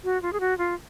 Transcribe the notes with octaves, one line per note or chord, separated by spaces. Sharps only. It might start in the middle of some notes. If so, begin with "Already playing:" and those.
F#4
F4
G#4
F#4
F4